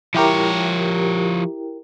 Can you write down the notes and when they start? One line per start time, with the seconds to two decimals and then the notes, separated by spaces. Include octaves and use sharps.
0.14 F3 E4 G4 A#4 C#5